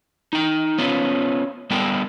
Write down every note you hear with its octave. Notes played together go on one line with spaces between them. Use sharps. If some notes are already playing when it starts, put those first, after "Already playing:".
D#4 G5
B3 C#4 F4
G3 B3 A4 A#4 G5